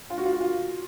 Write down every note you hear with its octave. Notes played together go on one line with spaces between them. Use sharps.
F4
F#4
F4
F#4
F4